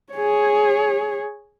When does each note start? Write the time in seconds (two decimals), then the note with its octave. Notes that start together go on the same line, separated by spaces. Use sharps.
0.13 G#4 C#5